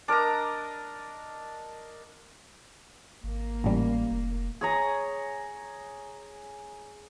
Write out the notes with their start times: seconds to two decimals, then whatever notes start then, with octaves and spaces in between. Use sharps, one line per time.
0.08 D4 A#4 D#5 A#5
3.24 G#1 A#3
3.64 A1 G3
4.11 F1
4.61 G#4 C#5 A#5